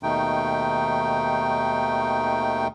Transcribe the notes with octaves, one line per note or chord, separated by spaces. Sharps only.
D#2 B2 D#3 A3 D#4 G5